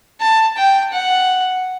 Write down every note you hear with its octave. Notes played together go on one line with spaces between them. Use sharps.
A5
G5
F#5